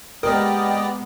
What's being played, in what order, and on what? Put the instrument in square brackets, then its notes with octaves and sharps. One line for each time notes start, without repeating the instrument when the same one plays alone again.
[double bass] G#3 B3 [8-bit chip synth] G4 D5 D#5 [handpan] A#4 [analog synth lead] G5